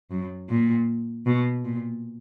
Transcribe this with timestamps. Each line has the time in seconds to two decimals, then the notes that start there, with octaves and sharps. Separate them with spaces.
0.11 F#2
0.50 A#2
1.26 B2
1.65 A#2